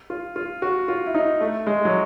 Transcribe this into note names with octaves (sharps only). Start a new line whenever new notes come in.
F4
F4
F#4
F4
E4
D#4
A3
G#3
F#3